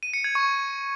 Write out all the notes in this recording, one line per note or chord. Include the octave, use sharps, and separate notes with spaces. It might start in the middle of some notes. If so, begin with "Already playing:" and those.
D#7
C#7
G#6
C#6